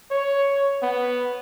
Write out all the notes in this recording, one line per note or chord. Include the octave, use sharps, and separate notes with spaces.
C#5
B3